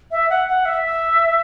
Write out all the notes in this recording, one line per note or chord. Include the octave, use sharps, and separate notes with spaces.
E5
F#5
F#5
E5